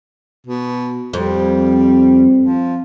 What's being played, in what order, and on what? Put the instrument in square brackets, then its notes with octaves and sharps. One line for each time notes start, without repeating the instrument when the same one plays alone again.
[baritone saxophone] B2
[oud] F2 [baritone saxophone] G3
[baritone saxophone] F3